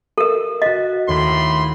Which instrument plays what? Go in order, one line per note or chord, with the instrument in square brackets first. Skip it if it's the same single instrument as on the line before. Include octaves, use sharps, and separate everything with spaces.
[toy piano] A4 A#4
[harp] F#4 B6 [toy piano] D#5
[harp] D#2 [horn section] A2 B5 C6